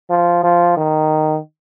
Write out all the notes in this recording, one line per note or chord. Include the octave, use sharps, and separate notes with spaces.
F3
F3
D#3